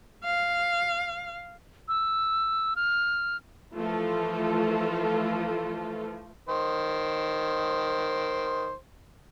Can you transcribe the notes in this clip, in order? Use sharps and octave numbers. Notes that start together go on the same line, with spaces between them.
F5
E6
F6
E3 F3 A3 F4 A4
D#3 C5